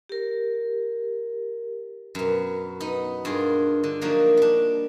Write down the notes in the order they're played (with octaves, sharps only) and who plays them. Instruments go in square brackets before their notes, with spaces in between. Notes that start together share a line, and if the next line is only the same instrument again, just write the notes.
[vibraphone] G4 A#4
[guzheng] F#2 B2
B3 D#4
G2 F4 G#4 A#4
D3
F3 F#3 A#3 D4 D#4 F#4
G3 D4